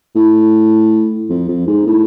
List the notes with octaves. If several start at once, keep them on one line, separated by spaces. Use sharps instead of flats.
A2
F2
F2
G#2
A2